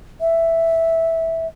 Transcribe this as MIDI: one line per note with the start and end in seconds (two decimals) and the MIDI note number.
0.21 1.47 76